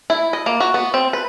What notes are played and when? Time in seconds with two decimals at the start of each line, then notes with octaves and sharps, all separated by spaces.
0.10 E4
0.33 D#5
0.46 A#3
0.60 F#4
0.74 B3
0.94 C4
1.13 B4